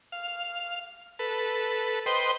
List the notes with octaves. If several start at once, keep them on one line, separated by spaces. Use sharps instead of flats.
F5
A4 B4
B4 C5 D#5 G5 C6